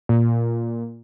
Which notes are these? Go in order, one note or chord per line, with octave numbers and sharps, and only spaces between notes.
A#2